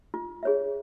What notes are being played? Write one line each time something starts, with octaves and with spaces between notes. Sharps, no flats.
F4
G#4 C#5 E5